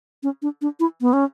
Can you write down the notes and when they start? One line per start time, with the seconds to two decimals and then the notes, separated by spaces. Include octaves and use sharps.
0.23 C#4
0.42 D4
0.62 D4
0.80 E4
1.01 B3
1.13 C#4